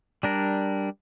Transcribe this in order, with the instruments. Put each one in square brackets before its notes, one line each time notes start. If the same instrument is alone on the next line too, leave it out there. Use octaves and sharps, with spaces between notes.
[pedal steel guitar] G3 D4 A#4